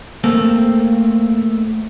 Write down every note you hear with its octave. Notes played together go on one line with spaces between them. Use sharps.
A3 A#3 C4